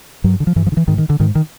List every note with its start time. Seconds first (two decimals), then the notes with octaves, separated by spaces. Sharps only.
0.24 G2 F#3
0.40 D3
0.47 F3
0.56 G2 E3
0.67 F3
0.72 D3
0.77 E3
0.88 G#2 D#3
0.98 D#3
1.10 D3
1.20 G#2 D#3
1.35 D#3